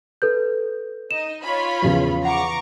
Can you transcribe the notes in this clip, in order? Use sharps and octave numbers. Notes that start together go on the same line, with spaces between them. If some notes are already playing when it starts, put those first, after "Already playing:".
A4 B4 G6
D#4 D#5 E7
F4 C#5 B5
E2 C#3 F3
F#5 A#5 C#6 D6